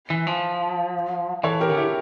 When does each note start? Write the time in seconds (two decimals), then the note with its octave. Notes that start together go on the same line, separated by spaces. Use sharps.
0.10 E3
0.27 F3
1.43 E3 A4 C#5
1.61 G4 A#4
1.69 D3
1.77 E4 G4